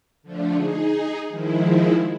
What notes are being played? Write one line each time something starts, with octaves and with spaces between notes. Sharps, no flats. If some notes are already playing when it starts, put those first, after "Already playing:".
D3 F3 A3 D4
D#4 G#4
D#3 F3 G#3 E4